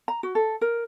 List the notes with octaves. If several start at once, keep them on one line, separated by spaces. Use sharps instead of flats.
A#5
F#4
A4
A#4